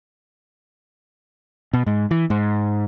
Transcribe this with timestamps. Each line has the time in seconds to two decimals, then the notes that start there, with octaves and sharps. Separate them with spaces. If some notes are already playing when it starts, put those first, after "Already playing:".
1.73 B2
1.87 G#2
2.11 E3
2.30 G#2